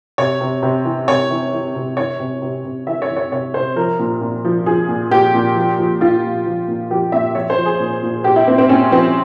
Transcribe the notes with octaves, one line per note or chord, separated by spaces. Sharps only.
C3 C#5
C3
C3
E3
C3 C#5
E3
E3
C3
E3 C#5
C3
C3
C3
E3 E5
C#5
E3
C#5
C3 C#5
C3 C5
F3 A#4
A#2
A#2
F3
F3 G#4
A#2
A#2 G4
A#2
F3
F3
A#2 F4
A#2
F3
A#2
F3 G4
A#2 E5
F3 C#5
C5
F3
G#4
A#2
A#2
A#2 G4
E4
A#2 C4
C4
A#2 C#4
F3 C4